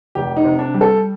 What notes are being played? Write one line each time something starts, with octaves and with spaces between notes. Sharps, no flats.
F1 G4
D#4
C3
D4
G3
A4